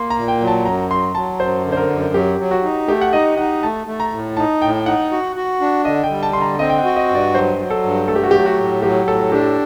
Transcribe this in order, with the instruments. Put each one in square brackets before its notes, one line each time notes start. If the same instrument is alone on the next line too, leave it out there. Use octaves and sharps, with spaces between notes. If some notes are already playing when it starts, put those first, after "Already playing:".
Already playing: [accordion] A#3 [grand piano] C6
[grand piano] A#5
[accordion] A#2
[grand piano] G5
[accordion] F#3
[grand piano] A5
[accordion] F#2 [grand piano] A#5
[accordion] F#3 [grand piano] C6
[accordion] F#3 [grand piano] A5
[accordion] F#2 [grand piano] C5
[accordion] D3
[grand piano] C5
A#4
[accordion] F#2
[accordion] F#3 [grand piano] G4
[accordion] F#3
[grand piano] F#4
[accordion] D#4
[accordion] A3 [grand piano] G4
[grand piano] F#5
[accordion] D#4 [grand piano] D#5
[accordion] D#4 [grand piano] F#5
[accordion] A3 [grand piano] A5
[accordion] A3
[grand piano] A#5
[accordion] A2
[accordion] D#4 [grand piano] A5
[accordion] A2 [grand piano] G5
[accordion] D#4 [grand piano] F#5
[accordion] F#4
F#4
D4
[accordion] D3 [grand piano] D#5
[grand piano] G5
[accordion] G3
[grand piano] A5
[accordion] D3 [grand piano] C6
[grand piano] A#5
[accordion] C4 [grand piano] D#5
[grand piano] G5
F#5
[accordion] F#4
[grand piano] D#5
[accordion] G2
[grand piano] D5
[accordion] F#3 [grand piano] C5
[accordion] F#3
[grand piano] A4
[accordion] G2
[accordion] A3 [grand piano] A4
[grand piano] G4
F#4
[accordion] F#3 [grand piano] G4
[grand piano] F#4
[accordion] A2
[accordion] F#3 [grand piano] G4
[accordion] A2 [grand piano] A4
[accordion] D4 [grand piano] G4